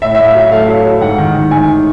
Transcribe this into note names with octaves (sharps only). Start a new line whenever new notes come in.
A2 E5
A2 E5
F5
F#3 E5
A3 F5
F#3
F#3
G#2 F#5
D#3
D#3
D#3 G#5